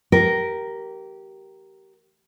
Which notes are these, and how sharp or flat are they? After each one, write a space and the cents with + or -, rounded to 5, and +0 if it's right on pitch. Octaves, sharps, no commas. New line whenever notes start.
G4 -20 A#4 +0